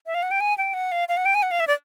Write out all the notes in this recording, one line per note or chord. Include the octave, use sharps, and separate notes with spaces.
E5
F5
F#5
G5
G#5
G5
F#5
F5
F5
F#5
G5
G#5
F#5
F5
E5
D5